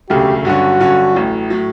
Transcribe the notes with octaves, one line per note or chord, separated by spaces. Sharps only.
E1 D2 C#3 F#3 A3 G4
G2 D3 F#3 C#4 F#4
G2 D3 F#3 C#4
A1 A2 F#3
A2 F#3